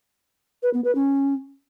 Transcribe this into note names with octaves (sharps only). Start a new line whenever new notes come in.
B4
B3
B4
C#4